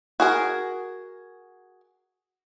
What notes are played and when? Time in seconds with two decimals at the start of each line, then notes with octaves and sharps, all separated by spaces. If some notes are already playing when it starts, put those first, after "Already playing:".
0.20 F#4 G#4 A#4